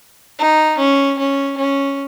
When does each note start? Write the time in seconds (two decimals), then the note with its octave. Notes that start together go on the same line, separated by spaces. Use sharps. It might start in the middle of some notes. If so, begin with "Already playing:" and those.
0.39 D#4
0.78 C#4
1.18 C#4
1.57 C#4